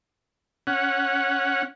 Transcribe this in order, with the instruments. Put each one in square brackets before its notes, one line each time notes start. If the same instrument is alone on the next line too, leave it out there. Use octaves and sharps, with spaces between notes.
[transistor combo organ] C#4 F#5